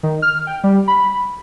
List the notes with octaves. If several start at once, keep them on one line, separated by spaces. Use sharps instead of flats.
D#3
F6
G5
G3
B5